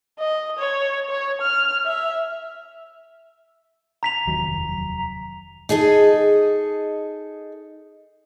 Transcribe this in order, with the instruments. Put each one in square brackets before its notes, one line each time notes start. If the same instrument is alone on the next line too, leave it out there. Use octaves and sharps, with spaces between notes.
[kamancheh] D#5
C#5
C#5
F6
E5
[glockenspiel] A#5 B6 F7
[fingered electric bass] F1 D#2 F#3
[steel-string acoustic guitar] D#4 G#4 A4 D#5